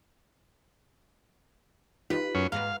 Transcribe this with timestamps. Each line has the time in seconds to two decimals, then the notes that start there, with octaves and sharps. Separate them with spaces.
2.10 D#4 F4 G4 B4
2.35 F#2 C#4
2.52 G#2 B4 F5 F#5 A#5